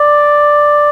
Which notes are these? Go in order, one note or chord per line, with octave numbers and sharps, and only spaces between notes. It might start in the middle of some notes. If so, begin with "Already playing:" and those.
Already playing: D5